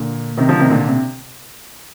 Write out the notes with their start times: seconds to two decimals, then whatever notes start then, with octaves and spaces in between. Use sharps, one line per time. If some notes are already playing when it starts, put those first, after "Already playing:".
Already playing: A#2 D3
0.37 C3 D#3
0.49 D3 F3
0.60 C3 D#3
0.70 A#2 D3
0.88 C3